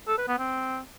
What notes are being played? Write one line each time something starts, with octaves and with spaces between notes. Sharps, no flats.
A4
B4
B3
C4